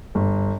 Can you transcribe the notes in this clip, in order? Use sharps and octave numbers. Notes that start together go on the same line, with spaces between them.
G1